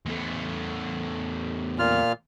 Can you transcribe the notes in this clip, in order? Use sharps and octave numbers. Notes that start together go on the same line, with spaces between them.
E2 A3
A#2 F4 F6